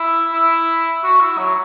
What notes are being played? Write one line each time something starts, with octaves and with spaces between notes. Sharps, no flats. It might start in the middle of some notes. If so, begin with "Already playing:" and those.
Already playing: E4
E4
F#4
E4
F#3